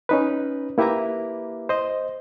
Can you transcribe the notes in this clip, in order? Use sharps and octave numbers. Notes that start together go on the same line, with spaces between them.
C#4 D#4 B4
A#3 E4 G4 B4 E5 A#5
C5 D#5